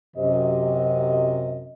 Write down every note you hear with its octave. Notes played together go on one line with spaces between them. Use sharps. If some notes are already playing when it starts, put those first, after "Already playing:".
F#2 C3 D#5